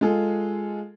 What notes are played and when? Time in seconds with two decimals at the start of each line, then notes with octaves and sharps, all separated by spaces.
0.01 G#3 F4 G#4 A4